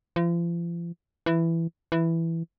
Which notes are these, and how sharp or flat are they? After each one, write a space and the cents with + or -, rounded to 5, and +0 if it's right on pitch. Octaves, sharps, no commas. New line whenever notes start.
F3 -40
E3 +10
E3 +5